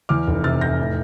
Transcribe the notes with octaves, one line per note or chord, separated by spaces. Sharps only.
E2 D6 F6
F1
C3 F6 A6
F1 G6 A#6
A2